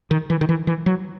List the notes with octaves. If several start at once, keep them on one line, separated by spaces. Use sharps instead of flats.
D#3
E3
D#3
E3
E3
F#3